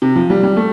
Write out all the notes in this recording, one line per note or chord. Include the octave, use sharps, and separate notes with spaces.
C3
F3
G3
G3
A3